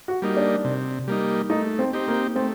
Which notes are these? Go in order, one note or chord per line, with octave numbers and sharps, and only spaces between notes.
F#4
G3 A#3 D#4
D4
C3
G3 A#3 D#4
A3 D#4
C4
C4 D#4 G4
A#3
A3 C4